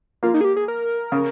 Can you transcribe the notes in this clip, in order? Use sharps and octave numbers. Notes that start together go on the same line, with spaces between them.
A#3 F4
D#4
G#4
G4
G#4
A#4
C#3